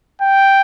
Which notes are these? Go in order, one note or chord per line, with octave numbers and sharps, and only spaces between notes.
G5